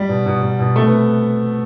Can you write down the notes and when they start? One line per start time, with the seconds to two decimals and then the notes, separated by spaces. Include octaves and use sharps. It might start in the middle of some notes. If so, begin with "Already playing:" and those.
Already playing: G3
0.09 B2
0.26 B2
0.42 B2
0.59 B2
0.75 C3 A3
0.87 B3